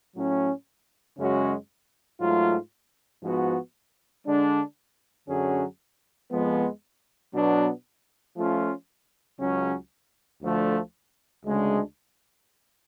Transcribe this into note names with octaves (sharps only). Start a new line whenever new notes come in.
A2 F#3 C#4
F#2 C#3 G#3 C#4 F#4
G#2 F#3 A3 F4
G#2 F3 B3 F#4
D3 G#3 D4
F#2 D3 F#3 C#4 G#4
F2 F3 G#3 B3
B2 F#3 B3 D4
F3 A3 C#4 F4
C#2 C#3 F#3 C#4
D2 D3 F3 A3
D2 C#3 G#3 D4